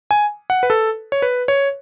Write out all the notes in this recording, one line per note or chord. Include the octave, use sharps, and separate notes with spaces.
G#5
F#5
B4
A4
C#5
B4
C#5